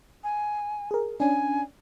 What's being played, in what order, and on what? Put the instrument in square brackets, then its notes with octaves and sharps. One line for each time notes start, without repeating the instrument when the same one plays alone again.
[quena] G#5
[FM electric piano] G#4 A#4
[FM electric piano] C#4 D4 [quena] G#5